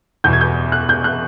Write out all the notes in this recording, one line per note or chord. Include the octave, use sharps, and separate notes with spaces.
E2 B2 G6
G#6
G6
F#6
G6
F#6